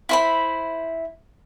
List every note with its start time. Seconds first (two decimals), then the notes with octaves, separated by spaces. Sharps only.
0.09 E4 C5 B5